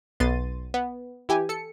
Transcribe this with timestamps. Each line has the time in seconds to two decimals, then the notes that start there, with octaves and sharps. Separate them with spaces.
0.20 B1 B3 C6 A6 D#7
0.74 B3
1.29 E3 G4 G#5
1.49 A4 C#7